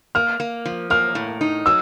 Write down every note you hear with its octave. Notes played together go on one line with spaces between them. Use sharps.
A#3 F6
A#3
F3
A#3 F6
A2
D#4
F#3 E6